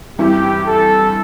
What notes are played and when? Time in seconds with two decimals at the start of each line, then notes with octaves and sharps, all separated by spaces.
0.19 G2 E3 C4 E4 G4
0.66 A4